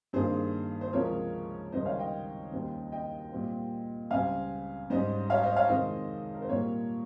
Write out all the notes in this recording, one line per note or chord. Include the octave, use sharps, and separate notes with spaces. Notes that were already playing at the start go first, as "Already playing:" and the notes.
G2 D#3 A#3 G#4 C5
C5
C#2 C3 F3 G#3 C#4 A#4 C#5
C#2 C3 D#3 G3 C5 D#5
C#5 F5
D#5 G5
D#2 C#3 G3 C4 D#4
D#5 G5
A#2 G3 C4
C#2 C#3 G3 C4 F5 G#5
G#2 G3 C#4 C5 D#5
C#5 F5
C5 D#5
C#5 F5
F2 C3 D#3 G#3 C5 D#5
A#4
C5
A#2 G3 A#3 A#4 C#5